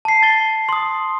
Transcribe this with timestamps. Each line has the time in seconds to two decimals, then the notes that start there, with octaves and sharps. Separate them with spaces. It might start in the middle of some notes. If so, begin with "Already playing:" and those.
0.05 A5 C7
0.23 A6 G7
0.69 C6 D#6